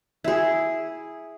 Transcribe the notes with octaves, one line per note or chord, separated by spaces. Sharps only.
E4 G#4